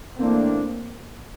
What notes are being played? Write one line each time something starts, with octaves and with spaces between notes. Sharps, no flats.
A2 E3 A3 A#3 C4 D4